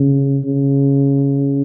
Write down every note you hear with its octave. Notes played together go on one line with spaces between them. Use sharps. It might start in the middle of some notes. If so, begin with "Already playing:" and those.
Already playing: C#3
C#3